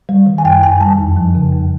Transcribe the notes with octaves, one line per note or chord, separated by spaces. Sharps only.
G3
D#3
G#5
F#2 G5
F#2 G#5
G3 A5
F2
F3
C#3
F2